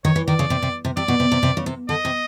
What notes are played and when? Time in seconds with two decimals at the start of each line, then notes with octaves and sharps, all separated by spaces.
0.04 D#3 C#5
0.16 E3
0.28 D#3 D5
0.39 C#3
0.50 C3
0.62 C3
0.85 C3
0.97 C3 D5
1.08 B2
1.20 C3
1.32 C3
1.43 C3
1.57 C#3
1.66 C3
1.89 D3 D#5
2.05 C3